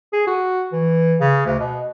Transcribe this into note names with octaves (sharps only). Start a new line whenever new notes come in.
G#4
F#4
E3
C#3
D2
B2